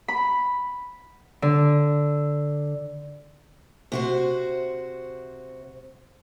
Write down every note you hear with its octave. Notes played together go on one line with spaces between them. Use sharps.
B5
D3
C3 F#4 C5